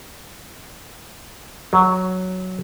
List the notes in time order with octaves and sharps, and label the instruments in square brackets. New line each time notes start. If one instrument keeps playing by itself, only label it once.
[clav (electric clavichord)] F#3